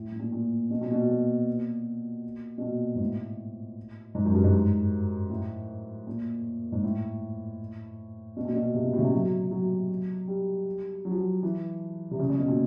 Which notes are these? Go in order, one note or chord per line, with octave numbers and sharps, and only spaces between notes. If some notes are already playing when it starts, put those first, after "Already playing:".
Already playing: A2
A2
A#2
A#2
B2
A#2
B2
A#2
B2
A#2
G#2
A2
G#2
F#2
G2
G#2
A2
A#2
G#2
A2
B2
A#2
B2
C3
B2
A2
C#3
C3
F#3
F#3
G3
F#3
F3
F#3
E3
C3
C#3
C#3
B2
A#2